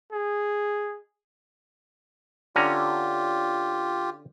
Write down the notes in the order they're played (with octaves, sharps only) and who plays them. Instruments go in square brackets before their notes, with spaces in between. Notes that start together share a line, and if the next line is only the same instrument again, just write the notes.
[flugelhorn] G#4
[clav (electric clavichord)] D3 C#4 A#5 [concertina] F4 G4